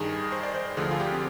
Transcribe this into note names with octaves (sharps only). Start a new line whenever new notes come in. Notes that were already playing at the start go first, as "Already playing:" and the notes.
Already playing: G2 D#3 G#4
C5
D5
C5
D2 D3 F3 G#4
F4
G4
C4